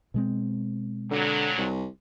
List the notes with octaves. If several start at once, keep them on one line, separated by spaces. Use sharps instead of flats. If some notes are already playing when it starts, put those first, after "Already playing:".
B2 G#3 C4
G2 A#2 D3 F#3
C2